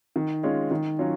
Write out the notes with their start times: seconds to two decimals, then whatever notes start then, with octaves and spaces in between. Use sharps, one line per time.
0.16 D#3
0.43 G#3 C#4 F4
0.71 D#3
0.99 F#3 C#4 F4